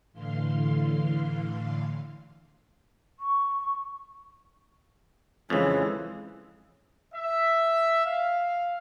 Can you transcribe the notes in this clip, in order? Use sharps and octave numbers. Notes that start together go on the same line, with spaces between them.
A2 D3 E3 F5 C6
C#6
F2 C#3 E3 F3 G#3
E5
F5